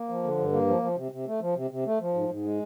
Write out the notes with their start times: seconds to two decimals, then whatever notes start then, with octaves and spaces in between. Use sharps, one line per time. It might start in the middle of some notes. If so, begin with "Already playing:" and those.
Already playing: A#3
0.09 F3
0.24 D3
0.38 G2
0.53 A#3
0.67 F3
0.82 F3
0.97 C3
1.12 C3
1.26 A3
1.41 F3
1.56 C3
1.71 C3
1.85 A3
2.00 F3
2.14 G#2
2.29 G#2
2.44 G#3